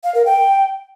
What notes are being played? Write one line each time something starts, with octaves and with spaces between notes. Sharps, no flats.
F5
A#4
G5